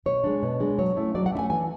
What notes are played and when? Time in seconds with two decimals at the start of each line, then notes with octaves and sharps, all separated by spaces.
0.06 B2 C#5
0.24 G#3 D4
0.43 B2
0.60 G#3 D4
0.79 F#3 C#5
0.97 A3 C#4 E4
1.15 F#3 D5
1.26 F#5
1.32 A3 C#4 E4
1.39 G#5
1.50 E3 G#5